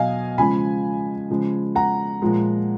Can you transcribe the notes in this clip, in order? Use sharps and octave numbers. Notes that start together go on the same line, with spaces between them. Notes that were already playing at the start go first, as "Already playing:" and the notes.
Already playing: B2 F#3 D#5 F5 G#5
C#3 F3 G#3 G#5 B5
C#3 F3 G#3
F#5 A#5
A#2 F3 G#3